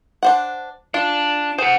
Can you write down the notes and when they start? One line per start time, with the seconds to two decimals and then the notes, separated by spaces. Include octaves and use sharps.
0.23 D4 C5 F#5
0.94 D4 F4
1.59 G#4 C5 F#5